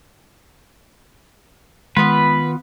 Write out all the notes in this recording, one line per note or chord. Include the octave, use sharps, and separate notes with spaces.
D#3 G#3 B3 F4 B4